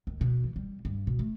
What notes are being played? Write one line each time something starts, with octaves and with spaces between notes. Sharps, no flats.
D#2
B2
E3
G3
G2
B2
A3